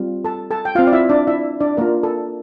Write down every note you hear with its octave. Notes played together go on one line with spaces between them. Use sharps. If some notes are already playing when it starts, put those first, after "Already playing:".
Already playing: G3 C4 F4
A4 A5
A4 A5
G5
C4 F4 F5
D5
E4 E5
D4 D5
E4 E5
D4 D5
A#3 F4 A#4
A4